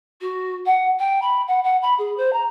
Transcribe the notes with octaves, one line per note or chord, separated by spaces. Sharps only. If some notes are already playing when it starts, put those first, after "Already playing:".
F#4
F#5
G5
B5
F#5
F#5
B5
G#4
C5
A#5